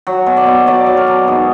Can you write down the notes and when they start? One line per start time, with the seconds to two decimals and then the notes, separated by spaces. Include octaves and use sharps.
0.07 F#3
0.26 B2
0.37 D5
0.46 B2
0.67 F#3 D5
0.86 F#3
0.97 A#4
1.07 B2
1.27 G#2 G#4